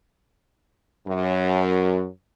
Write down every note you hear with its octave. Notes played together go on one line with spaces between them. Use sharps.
F#2